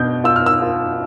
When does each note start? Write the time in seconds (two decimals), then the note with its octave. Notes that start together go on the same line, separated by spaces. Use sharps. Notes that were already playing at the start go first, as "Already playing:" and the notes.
Already playing: B2 D4 G6
0.24 F4 E6
0.36 F6
0.46 E6
0.62 F4